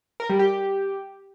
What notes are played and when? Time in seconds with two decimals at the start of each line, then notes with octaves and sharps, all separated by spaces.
0.20 A#4
0.30 G3
0.39 G4